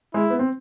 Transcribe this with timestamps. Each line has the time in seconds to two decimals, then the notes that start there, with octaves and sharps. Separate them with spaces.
0.14 G#3 E4
0.30 B3
0.39 C4